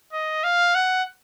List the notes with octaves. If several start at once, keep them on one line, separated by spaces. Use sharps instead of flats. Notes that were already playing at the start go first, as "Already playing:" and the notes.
D#5
F5
F#5